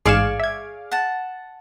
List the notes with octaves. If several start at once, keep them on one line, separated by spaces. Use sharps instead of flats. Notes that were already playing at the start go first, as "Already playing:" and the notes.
A1 G#2 G#4 D5 F5 G#5 C#6 E7
E5 G#6
F#5 A5